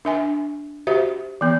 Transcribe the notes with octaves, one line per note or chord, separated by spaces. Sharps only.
D4 E5 G#5
F#4 G4 C5 E5
E3 B3